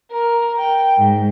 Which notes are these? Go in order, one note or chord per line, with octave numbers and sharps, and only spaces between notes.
A#4
G5
G#2